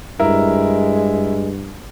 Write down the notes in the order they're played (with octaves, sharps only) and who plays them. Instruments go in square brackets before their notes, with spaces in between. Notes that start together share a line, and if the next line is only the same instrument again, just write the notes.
[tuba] G2 [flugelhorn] G#3 [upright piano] E4 A#4